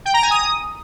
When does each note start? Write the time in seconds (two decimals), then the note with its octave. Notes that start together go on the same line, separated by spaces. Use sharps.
0.05 G5
0.14 A#5
0.22 G#5
0.31 D#6